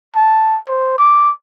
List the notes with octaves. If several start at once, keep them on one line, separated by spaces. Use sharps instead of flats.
A5
C5
D6